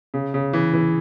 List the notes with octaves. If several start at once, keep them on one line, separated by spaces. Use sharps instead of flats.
C#3
C#3
E3
E3